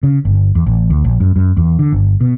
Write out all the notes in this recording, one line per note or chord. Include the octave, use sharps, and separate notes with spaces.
C#3
G1
E2
A1
D2
A#1
F#2
F#2
E2
D3
G1
B2